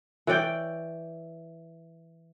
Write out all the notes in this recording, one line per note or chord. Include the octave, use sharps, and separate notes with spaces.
E3 C#5 D5 G5